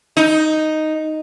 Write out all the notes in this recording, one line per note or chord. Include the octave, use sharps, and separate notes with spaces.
D#4